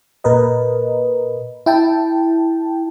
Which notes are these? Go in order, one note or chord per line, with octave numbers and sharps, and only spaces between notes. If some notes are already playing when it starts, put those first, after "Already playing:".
A#2 A#4 B4 D#5
E4 G5 A5